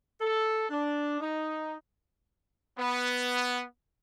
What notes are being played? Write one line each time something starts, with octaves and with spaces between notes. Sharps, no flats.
A4
D4
D#4
B3